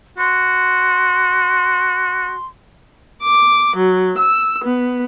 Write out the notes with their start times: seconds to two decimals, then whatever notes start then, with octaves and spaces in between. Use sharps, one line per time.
0.18 F#4 C6
3.22 D6
3.77 F#3
4.18 E6
4.64 B3